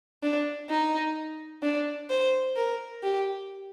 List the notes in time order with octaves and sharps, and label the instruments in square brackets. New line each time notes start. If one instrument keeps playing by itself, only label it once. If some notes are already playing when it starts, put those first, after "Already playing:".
[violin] D4
D#4
D4
C5
A#4
G4